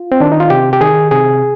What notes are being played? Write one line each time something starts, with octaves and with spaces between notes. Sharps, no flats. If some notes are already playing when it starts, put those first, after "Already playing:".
Already playing: F4
C4
D#3 D4
D#4
F4
C3 G4
G4
D#3 G#4
C3 G#4